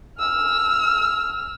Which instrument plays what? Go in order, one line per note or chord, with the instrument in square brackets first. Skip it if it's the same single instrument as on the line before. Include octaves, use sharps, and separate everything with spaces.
[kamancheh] E6 F6